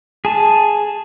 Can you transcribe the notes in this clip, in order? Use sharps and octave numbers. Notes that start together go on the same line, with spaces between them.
G#4 A5